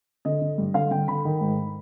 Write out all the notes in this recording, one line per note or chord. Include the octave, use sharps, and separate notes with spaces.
D3 D#5
D3
G2
D3 F5
D3 G5
D3 B5
D#3
G#2